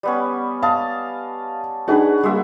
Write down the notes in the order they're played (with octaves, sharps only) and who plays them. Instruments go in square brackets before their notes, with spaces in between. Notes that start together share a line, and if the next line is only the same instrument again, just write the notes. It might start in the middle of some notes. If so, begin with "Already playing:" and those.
[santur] G3 B3 C#4
[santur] D#5 A5 [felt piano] F5
[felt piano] D4 D#4 G#4 [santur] F#4 B4
[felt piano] G3 A#3 [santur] G#3 F#4 E5